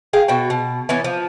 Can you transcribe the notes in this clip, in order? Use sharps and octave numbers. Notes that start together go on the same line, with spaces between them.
G#4 F5 G5
B2 F#4 G5
B2
E3 B3 C#4
F3